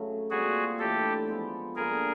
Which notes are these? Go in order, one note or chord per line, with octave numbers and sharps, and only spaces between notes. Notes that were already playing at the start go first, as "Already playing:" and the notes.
Already playing: C#3 F#3 A3
A#2 G3 C4 F4 F#4 G#4
A2 E3 A3 D4 G4 A4
F3 G#3 B3
G2 D3 G3 A#3 G#4 A#4